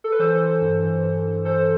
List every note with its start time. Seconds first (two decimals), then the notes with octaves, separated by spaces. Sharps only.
0.04 A4
0.12 B4
0.19 E3 A4 C5
0.40 E3
0.61 G2
0.83 E3
1.03 G2
1.24 G2
1.45 E3 A4 C5